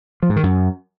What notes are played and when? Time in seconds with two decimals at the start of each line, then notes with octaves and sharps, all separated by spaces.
0.23 F3
0.29 G#2
0.36 D#3
0.43 F#2